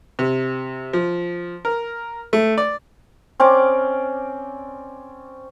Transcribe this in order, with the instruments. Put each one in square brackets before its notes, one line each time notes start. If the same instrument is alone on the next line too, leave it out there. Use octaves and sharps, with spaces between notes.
[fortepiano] C3
F3
A#4
A3
D5
[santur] C4 C#4 D5 D6